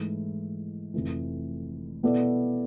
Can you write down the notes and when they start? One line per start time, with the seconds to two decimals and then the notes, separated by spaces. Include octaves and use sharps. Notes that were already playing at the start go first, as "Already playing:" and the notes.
Already playing: G#2 E3 A3 E4
0.94 F1 F2 E3
2.03 B2 B3 E4 A4 D5